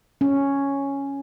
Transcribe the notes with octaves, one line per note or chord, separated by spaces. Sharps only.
C#4